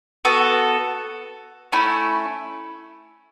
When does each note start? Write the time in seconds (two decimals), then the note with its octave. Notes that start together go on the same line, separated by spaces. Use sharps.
0.25 B3 F#4 A4
1.72 A3 C#4 E4